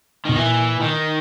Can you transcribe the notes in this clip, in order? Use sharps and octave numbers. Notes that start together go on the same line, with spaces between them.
B2 D#3
A#2 E3
D#3